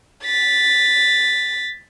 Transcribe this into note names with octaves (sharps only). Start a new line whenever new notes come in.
A6 B6